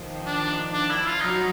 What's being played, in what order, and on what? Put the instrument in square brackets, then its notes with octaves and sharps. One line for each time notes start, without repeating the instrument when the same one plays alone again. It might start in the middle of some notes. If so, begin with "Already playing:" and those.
Already playing: [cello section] D#3 F3
[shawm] D4
D4
E4
F4
[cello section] F#3 [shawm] D#4